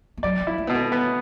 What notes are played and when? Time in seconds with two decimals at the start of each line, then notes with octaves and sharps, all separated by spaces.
0.17 A3
0.23 F#3 D5
0.41 F#3
0.47 E4
0.58 A3
0.67 B2 B3
0.75 A3
0.92 B3